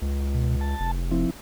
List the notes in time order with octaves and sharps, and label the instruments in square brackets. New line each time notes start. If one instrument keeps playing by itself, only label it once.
[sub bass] C#2
[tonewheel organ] B2
A5
[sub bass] F1
[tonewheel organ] F3 C4 E4